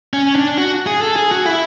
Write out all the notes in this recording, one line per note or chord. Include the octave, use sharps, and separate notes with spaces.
C#4
D4
F#4
G#4
A4
G#4
F#4
E4